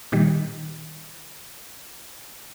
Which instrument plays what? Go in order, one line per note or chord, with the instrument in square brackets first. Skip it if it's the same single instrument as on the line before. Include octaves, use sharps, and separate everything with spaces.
[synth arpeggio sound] A#2 D#3 G3